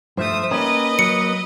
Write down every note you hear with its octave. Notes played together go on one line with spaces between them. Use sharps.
G2 F3 A3 C5 E5 D#6
A#3 C#4 D#4 G4 B4 D#5 D#6
F#3 C#7